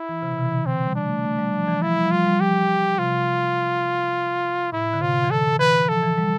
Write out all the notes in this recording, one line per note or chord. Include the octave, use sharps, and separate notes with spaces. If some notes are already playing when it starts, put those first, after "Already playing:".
Already playing: E4
E3
C3
B2
C3
E3
D3
E3 C4
G3
D4
A3
A3
G3
F3
E3
F3 E4
G3
F3
G3 F4
G3
F3 G4
C3 F4
A2 E4
D3
C3 F4
E3
D3 A4
E3 B4
F3 A4
E3
G3